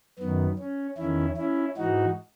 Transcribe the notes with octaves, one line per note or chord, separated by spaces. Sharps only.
F#2 D#3 B3
C#4
E2 D#3 C#4 E4
C#4 E4
G#2 E3 D#4 F#4